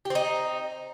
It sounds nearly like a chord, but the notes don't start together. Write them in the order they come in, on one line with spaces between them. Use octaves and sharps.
G4 C4 D#4